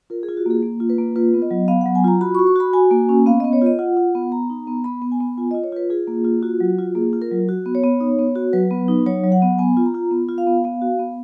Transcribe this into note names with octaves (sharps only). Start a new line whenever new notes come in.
F4 A#4
G#4
F4
F#4
A#3 G#4
A#3
F4
B4
A#3
F4 B4
B3
D#5
F#3
B3 F5
F#3 F#5
G#5
F4 A#5
F#4 B5
C#6
F#4
C#6
F#4 B5
F#4 G#5
A#3
C#4
B3 F5
B3 D#5
C#5
F4 D#5
F4 F#5
F4
B3
B3 A#5
D#4
B3
B3 B5
B3
G#5
B3
F4 G#5
F4 D#5
C#5
F4 B4
F4 G#4
A#3
F4
F4 F#4
F#3
F4
A#3 G#4
F4
A#4
F#3
F#4
B3
C#5
B3
D#4
B3
F#4
F#3 B4
B3
D#4
F#3 C#5
F#3
F#5
B3
B3 G#5
F4
A#5
F4
B3
F4
F5
B3
B3 F5
F#4
B3